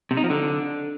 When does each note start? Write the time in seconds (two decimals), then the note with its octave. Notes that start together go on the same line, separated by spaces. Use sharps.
0.11 C3
0.17 D#4
0.24 F3
0.30 D3